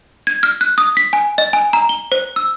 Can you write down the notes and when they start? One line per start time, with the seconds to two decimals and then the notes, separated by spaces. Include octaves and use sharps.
0.27 G#6
0.43 F6
0.61 F#6
0.78 D#6
0.97 B6
1.13 G#5
1.38 D#5
1.53 G#5
1.73 A#5
1.89 G7
2.12 C5
2.36 E6